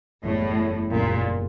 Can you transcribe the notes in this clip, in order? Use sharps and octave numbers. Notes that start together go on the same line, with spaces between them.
F#1 E2 A2 C#3 E3 G3
F#1 E2 A#2 C#3 E3 G3